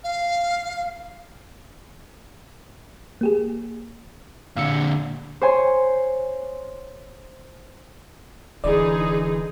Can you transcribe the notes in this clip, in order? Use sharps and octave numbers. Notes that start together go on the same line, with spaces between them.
F5
A#3 G4 G#4
A#2 D3 F5 E6 C#7
C5 C#5 G#5 C6
D1 D3 E3 D#4 G#4 D5